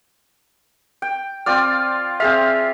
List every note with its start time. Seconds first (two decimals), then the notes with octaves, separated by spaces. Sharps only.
1.02 G5
1.46 C4 F4 D5 F6
2.20 C4 G#4 E5 F5